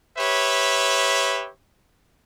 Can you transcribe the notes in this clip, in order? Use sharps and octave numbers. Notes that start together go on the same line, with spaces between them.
G4 B4 C#5 E5